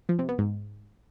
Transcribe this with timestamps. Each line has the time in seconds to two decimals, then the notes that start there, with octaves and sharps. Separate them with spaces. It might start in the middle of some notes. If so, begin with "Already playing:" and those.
0.09 F3
0.19 C3
0.29 B3
0.39 G#2